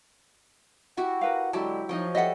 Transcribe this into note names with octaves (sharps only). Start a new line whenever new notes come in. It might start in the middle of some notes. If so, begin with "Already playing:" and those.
E4 F#4 G4 F#5
A#4 B4 F5
D3 F#3 G#3 E4 G4 A5
F3 D#4 C#5 D#5 G5
G3 A4 D#5 E5 F#5